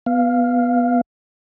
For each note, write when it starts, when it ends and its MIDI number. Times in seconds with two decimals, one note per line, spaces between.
0.06 1.01 59
0.06 1.01 77